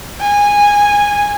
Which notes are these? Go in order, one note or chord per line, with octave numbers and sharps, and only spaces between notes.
G#5